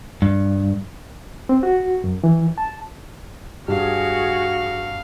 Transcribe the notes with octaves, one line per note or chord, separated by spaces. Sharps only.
G2
C4
F#4
F#2
E3
A5
G2 F#4 G#4 F5